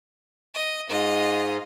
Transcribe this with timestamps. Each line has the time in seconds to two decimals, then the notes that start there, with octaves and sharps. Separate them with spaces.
0.55 D#5
0.89 G#2 F4 D#5